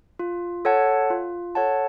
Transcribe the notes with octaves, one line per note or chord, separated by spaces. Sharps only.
F4
A4 C#5 F#5 A5
F4
A4 C#5 F#5 A5